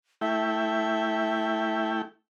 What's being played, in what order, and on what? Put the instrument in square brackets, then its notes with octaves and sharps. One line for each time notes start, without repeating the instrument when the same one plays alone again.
[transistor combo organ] A3 E4 G5 [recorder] E5